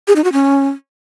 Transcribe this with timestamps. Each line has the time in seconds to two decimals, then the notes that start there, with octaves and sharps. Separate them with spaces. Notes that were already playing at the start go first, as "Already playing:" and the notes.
0.08 G#4
0.16 D#4
0.24 F#4
0.33 C#4